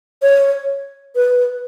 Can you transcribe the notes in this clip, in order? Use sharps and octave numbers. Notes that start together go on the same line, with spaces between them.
C#5
B4